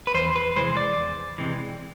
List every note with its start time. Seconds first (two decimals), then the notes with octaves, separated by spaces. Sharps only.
0.07 B4
0.14 E2 C5
0.36 B4
0.56 C3 E3 G#3 C5
0.77 D5
0.97 E2
1.38 C3 E3 G#3